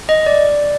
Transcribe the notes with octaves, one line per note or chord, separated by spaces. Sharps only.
D#5
D5